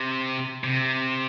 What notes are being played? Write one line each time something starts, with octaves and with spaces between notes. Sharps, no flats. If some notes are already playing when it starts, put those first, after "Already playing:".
Already playing: C3
C3